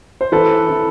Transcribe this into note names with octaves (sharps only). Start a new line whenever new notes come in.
C5
E3 A4 B4
E3